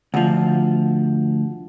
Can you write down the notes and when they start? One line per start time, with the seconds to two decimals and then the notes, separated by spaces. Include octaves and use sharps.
0.14 D2 F3